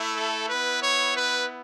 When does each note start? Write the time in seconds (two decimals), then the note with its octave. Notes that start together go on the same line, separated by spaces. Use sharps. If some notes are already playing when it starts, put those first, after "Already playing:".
Already playing: A3 E4
0.15 A4
0.49 B3 E4 B4
0.83 C#5
1.17 B4